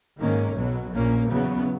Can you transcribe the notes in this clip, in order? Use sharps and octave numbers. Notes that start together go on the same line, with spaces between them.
G#2 D#3 A#3 C#4
B1 B2 F#3
A#1 A#2 A#3 C#4
E2 C#3 F#3 B3